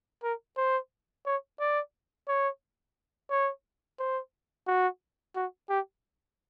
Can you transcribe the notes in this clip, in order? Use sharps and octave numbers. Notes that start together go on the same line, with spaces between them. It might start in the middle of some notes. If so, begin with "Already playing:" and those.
A#4
C5
C#5
D5
C#5
C#5
C5
F#4
F#4
G4